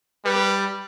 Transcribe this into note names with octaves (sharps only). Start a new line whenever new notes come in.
G3 B4